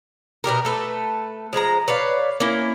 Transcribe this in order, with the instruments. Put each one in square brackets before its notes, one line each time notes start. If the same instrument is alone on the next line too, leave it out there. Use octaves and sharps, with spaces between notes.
[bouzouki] B2 G3 G4 A#4
A3 A4 B4
F3 G#3 A#4 A#5
B4 C#5 D5 F5
A#3 C#4 E4